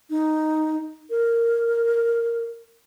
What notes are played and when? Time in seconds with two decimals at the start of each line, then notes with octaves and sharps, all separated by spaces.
0.10 D#4
1.10 A#4